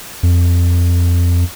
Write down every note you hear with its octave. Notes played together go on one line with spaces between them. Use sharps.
F2